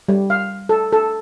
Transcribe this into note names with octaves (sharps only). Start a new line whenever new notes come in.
G3
F5
A4
A4